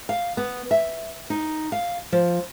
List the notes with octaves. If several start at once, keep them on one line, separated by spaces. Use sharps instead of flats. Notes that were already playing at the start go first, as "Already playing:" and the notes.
F5
B3
E5
D#4
F5
F3